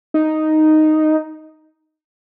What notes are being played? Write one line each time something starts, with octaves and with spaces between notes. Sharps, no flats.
D#4